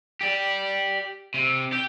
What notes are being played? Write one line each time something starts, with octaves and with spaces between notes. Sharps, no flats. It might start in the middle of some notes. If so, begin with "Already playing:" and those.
G4 D5
C3
G4